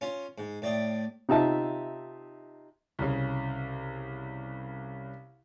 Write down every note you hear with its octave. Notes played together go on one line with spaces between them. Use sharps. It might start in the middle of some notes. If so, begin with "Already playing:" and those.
C#4 F4
G#2
A2 D5 G5 D#6
C3 D#4 F4 E5 A5
C2 C#3